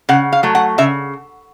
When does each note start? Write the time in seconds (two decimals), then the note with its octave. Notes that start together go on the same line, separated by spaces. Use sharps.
0.09 C#3 F#5
0.33 F5
0.43 F#3 A3
0.55 F#5
0.78 C#3 E5